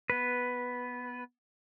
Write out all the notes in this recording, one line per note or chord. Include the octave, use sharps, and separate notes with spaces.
B3 B4